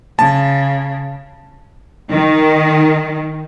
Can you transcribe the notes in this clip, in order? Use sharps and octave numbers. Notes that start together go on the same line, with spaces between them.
C#3 A5
D#3